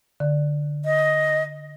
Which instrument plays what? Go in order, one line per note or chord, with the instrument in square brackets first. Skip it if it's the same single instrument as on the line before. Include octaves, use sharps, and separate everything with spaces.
[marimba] D3
[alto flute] D#5